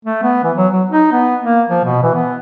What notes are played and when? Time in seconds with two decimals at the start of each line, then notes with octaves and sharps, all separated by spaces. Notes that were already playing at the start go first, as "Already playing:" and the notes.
0.05 A3
0.23 B3
0.43 E3
0.57 F#3
0.73 F#3
0.90 D#4
1.12 B3
1.42 A#3
1.68 F3
1.84 B2
2.03 E3
2.15 B3